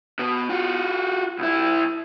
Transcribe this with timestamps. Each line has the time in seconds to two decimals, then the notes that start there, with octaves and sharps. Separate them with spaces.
0.19 B2 B3
0.49 F4 F#4
1.39 C2 E4